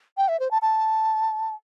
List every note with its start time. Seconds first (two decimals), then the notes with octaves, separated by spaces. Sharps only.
0.17 G5
0.28 E5
0.40 C5
0.51 A5
0.62 A5